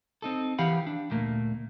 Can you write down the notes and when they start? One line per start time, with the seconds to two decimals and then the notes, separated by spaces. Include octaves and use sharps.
0.22 C4 D#4 A4
0.59 E3 G4 F5 F#5 B5
0.87 D4
1.10 D2 A#2 A3 A#3